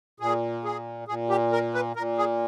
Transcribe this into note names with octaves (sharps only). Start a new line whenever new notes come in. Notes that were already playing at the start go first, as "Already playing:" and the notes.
A#2 G#4
G#4
A#2 G#4
G4
A#4
B4
A#2 A#4
G#4